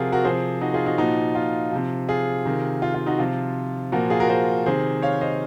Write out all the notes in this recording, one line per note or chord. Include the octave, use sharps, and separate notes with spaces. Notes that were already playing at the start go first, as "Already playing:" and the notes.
Already playing: C3 F3 F4 F#4 G#4 A#4
F#4 A#4
C3 F3 G#4 C5
D#4 F#4
F4 G#4
D#4 F#4
A#2 F3 D#4 F#4
F4
C3 F3
F4 G#4
C3 D#3
F4
F4
D#4 F#4
C3 F3 F4
A#2 F3 F#4 A#4
F4 G#4
F#4 A#4
G#4 C5
C3 D#3 G#4 C5
C#5 F5
C5 D#5